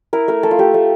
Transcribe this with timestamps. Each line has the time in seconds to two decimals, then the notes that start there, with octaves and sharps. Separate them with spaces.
0.13 E4 A#4
0.28 A3 A#4
0.43 A3 A4
0.51 F4
0.58 A3 G4
0.74 A3